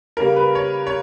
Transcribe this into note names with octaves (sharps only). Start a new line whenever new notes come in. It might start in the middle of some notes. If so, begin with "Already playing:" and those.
C#3 G3 A#3 A#4
B4
C#5
C#5